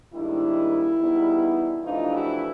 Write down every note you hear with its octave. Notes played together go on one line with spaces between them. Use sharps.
G#2 D#3 G3 A#3 D4 E4
E2 B2 G3 B3 D#4
F2 C3 E3 A3 D4 D#4 F4
E4 F#4